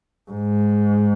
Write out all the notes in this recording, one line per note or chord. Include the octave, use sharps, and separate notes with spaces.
G#2